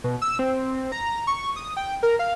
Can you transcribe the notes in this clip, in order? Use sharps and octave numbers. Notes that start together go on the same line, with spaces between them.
B2
E6
C4
A#5
C#6
D#6
G5
A#4
F5